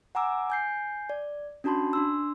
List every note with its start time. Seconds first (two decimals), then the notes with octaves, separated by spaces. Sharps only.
0.15 F#5 G#5 A#5 D6 E6
0.50 G#5 G6 C7
1.10 D5
1.64 C#4 D4 F#4 A5 B5 C6
1.93 D4 C6 E6